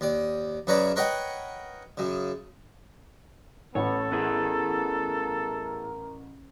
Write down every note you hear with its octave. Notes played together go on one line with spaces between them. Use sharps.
D#2 D5
F#2 C#3 B4 C#5 D5 A#5
A#4 B4 C#5 D#5 F#5 G5
F#2 C#3
A1 B3 A4 C#5
B3 E4 G#4 A#4